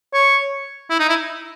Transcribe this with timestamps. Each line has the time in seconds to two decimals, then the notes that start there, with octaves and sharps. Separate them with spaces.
0.13 C#5
0.90 E4
0.99 D#4
1.09 E4